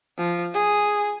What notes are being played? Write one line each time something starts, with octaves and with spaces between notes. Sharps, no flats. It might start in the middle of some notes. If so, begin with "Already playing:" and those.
F3
G#4